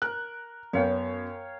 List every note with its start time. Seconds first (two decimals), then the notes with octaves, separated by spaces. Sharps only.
0.02 A#4 F#6
0.73 F#2 B3 C#5 F5 G5